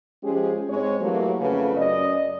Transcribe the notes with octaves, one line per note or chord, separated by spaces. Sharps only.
F3 G#3 C#4 G4 G#4
G#2 G#3 C4 C#5
E3 F#3 A3 A#3 F#4 G4
F2 C#3 A3 C#4 B4
F#2 D5 D#5